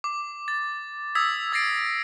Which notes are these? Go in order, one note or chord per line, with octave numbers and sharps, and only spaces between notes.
D6
A6
D#6 E6 G#6 B6
E6 A6 A#6 C7 D7